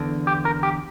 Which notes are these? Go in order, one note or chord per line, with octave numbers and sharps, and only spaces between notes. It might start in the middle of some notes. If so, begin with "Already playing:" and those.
Already playing: E2 D3
G4
A#4
G4